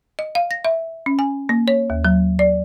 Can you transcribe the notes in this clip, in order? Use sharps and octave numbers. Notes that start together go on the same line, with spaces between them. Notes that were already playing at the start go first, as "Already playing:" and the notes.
D#5
F5
A#6
E5
C#4
G#5
A#3
C#5
D#2
F#3
D5